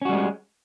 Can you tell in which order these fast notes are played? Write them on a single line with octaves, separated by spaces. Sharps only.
C#4 F#4 G3 G#3